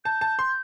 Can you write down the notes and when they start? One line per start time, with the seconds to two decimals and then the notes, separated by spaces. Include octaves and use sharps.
0.05 A5 G6
0.21 A5
0.39 C6